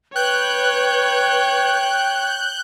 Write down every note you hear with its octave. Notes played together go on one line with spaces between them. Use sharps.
B4 C#5 G5 F#6 G6